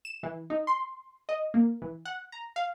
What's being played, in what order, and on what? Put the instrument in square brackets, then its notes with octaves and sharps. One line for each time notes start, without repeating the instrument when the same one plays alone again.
[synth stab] E7
E3
D#4
C6
D#5
A#3
E3
F#5
A#5
F5